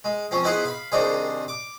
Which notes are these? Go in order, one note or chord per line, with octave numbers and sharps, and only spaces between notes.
G#3
F3 C4 C#4
B3 D#4 E4 G#4 C5 F#5
F5 B5
C2 D#3 D4 D#4 G#4 C5
D6